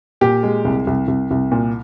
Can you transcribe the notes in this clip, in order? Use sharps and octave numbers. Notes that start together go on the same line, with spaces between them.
A#2 G4
G#3
C2
C2
C2
C2
A#2